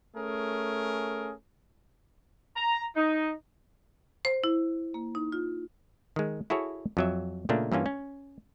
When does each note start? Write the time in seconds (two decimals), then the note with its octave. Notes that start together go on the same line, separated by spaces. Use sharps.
0.15 A3 C#4 G#4 A#4
2.56 A#5
2.96 D#4
4.25 C5
4.44 E4
4.94 A#3
5.15 D#4
5.32 F4
6.16 D#3 G#3
6.50 E4 F#4 G#4 A4 C#5
6.97 F2 F#3 E5
7.49 A#2 C#3 A3 A#3 D4
7.72 G2 E3 A#3 C#4 F4
7.86 C#4